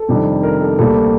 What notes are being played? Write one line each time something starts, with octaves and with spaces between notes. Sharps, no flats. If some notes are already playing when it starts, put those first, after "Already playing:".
Already playing: A4
F2 C3 D#3 G3 D4
A#4
A4
D2 C3 G3 A#3 A4